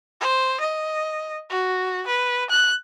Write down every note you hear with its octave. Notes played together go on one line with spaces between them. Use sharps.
C5
D#5
F#4
B4
F#6